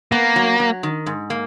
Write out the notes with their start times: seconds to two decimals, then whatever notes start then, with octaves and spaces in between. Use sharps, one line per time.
0.12 A#3 B3
0.36 F#3
0.60 F#3
0.83 D#3
1.06 G#2
1.30 A#3